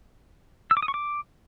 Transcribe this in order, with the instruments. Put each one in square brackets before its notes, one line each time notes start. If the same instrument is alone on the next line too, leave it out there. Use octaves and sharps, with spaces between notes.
[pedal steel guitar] E6
D6
D#6
C#6
D6